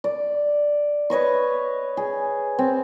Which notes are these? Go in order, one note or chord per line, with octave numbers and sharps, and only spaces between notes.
D5
B4 C#5 D#5 C#6
G#4
C4